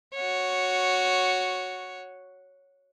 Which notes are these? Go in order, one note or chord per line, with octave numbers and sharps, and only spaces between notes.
F#4 C#5